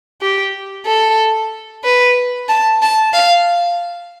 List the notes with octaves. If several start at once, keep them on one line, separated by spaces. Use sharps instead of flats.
G4
A4
B4
A5
A5
F5